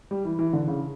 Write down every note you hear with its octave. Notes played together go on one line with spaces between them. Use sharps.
G3
E3
E3
D3
C#3